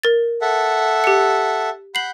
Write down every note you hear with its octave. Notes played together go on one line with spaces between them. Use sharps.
A#4 A6
A4 E5 F#5
G4 C#7
F#5 B5 G6 C7 F#7